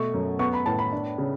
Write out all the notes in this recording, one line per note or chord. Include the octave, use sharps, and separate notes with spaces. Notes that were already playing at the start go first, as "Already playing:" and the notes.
Already playing: B2 A3 C#6
F#2
B3 C#6
B5
A2 A5
B5
D4
C#3